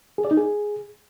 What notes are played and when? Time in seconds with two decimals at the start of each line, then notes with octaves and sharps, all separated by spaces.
0.18 G#4
0.25 D5
0.31 D#4
0.37 G#4